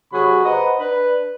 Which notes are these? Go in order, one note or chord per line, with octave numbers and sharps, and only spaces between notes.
C3 F#3 F#4 G#4 B5
B4 C5 D#5 F#5 A#5
D4 B4